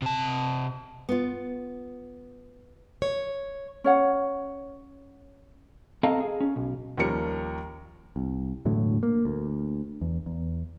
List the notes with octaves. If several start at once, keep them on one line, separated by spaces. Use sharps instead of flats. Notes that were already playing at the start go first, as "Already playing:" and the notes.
C3 A5
B3 F4
C#5
C#4 C#5 F#5
C4 A4 D#5 F5 A5 A#5
G#4
C#4
B1
D#2 F3 G3 C#4 A#4 C#7
C2
E1 A2 D3 F#3
A#3
D2
E2
E2